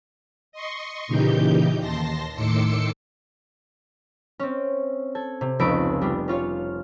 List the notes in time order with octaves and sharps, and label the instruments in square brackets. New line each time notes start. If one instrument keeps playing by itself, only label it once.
[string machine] D#5 C6 C#6
A#2 C#3 E3 D#4 G4 G6
D#2 A5 C6 A#6
A2 D#3 C6 D6 E6 C#7
[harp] C4 C#4
A4 G#6
C3
F1 C#2 B3 B5 E6 D7
G3 B3 D4
C#4 F4 C#5 F5